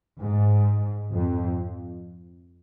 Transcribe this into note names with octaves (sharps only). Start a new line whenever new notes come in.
G#2
F2